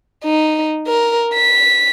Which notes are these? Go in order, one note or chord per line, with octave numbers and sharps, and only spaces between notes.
D#4
A#4
B6